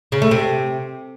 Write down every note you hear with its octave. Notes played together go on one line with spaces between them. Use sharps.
C#3
A3
C3